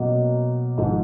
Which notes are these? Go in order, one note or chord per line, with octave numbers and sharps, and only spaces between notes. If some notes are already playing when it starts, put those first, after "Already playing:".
Already playing: B2 F#3 A#3 C#4 F#4
G#1 G#2 F3 G#3